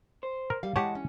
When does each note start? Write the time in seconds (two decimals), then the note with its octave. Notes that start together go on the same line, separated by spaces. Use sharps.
0.23 C5
0.50 A#4
0.63 G3 F5
0.76 E3 G#3 G4 C#5 F#5 A5
0.95 C#4